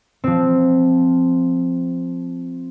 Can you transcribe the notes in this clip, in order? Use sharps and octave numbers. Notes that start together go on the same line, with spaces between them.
F3 C4